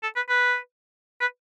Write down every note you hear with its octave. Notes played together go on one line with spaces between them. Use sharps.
A4
B4
B4
B4